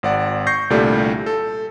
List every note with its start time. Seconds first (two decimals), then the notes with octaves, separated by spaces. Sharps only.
0.03 G#1 D5 F#5
0.47 C#6 G6 A#6 C7
0.70 C2 A#2 D3 G3 A3
1.26 A4